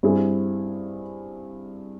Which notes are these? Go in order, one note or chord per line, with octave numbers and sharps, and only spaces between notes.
G2 G3 C4 E4 G#4